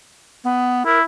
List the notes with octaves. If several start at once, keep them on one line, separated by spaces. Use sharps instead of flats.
B3
E4 A#4